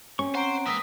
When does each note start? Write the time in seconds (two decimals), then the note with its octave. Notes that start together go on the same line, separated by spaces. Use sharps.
0.19 C4 C#4 C#6
0.35 C5 F#5 A#5 D7
0.67 G#3 A#3 C4 B4 E5 D#6 A#6 B6